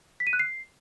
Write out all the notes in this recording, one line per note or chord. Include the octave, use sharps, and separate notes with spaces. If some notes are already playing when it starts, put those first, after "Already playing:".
B6
D#7
F#6
C7